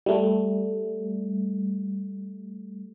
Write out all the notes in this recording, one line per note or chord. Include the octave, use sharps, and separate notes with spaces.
G3 A3